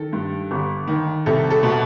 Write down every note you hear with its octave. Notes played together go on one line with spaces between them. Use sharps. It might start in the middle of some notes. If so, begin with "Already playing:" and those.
Already playing: D#3 A4
G2
G1
D#3
C2 A4
A4
B2